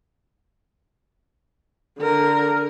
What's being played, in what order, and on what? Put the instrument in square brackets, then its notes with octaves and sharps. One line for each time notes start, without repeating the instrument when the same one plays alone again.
[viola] D3 A#4